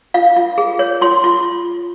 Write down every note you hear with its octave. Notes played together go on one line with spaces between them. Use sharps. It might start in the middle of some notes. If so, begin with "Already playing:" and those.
F4 F5
F4
G#4
C#5
F4 C6
F4